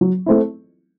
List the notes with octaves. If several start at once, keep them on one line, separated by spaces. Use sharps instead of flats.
F#3
A3 C4 E4